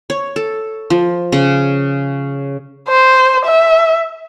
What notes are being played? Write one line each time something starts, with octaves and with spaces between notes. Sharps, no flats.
C#5
A4
F3
C#3
C5
E5